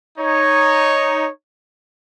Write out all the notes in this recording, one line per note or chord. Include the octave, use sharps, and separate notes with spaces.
D#4 C#5